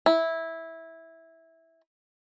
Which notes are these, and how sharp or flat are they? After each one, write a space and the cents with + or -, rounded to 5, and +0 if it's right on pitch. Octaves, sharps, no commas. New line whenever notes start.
E4 -10